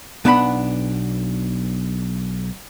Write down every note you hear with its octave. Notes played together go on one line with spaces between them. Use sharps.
B1 B3 D4 F#5 G#5 B5